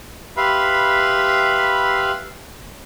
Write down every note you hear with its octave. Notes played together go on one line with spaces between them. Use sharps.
G4 B4 E5 F5 B5 C6